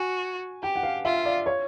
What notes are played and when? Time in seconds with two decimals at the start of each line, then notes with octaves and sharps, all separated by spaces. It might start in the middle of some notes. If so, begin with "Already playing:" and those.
Already playing: F#4 G#5
0.63 G4 G5
0.76 F#5
0.83 F5
1.05 F4 E5
1.25 D5
1.46 C#5